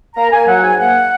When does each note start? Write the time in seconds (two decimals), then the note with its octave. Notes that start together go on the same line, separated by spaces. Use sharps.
0.15 A#3 A#5
0.31 A#3 G#5
0.47 F#3 F#5
0.63 G#2 G#5
0.79 A#3 F#5